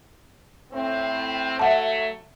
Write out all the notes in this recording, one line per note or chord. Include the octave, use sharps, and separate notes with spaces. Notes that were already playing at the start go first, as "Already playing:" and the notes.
A2 C4
F#3 A3 E5 F#5 A5